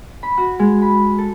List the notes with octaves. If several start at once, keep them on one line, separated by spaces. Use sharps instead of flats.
B5
F#4
G#3
B5
A4